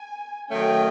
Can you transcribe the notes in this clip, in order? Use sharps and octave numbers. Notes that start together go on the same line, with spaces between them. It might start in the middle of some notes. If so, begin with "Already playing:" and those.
Already playing: G#5
D#3 F#3 A3 C#4 G5